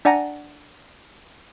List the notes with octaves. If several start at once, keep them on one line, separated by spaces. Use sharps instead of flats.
D4 D5 F#5 G#5 A#5 A#6